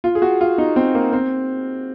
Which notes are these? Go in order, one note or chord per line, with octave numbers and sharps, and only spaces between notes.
F4
G#4
F#4
F4
D#4
C4
A#3
C4